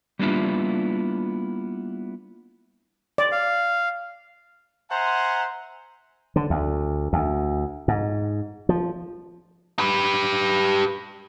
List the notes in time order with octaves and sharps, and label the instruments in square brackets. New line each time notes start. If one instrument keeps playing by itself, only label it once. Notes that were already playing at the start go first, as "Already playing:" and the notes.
[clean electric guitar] G3 A#3 B3 D4 E4 F4
[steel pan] D5
[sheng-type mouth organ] F5
[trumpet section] C5 E5 F#5 G#5 A#5 C6
[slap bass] D3
D2
D2
G#2
F3
[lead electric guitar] G4 B4